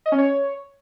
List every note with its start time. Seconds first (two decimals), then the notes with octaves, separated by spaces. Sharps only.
0.06 D#5
0.12 C#4
0.18 C#5